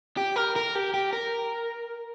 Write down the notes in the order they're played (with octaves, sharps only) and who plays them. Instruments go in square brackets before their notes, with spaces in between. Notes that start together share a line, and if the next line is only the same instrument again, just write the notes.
[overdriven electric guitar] G4
A#4
A#4
G4
G4
A#4